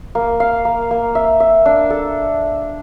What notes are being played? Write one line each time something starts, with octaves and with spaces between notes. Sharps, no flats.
A#3
F5
A#3
A#3
E5
E5
D4
A4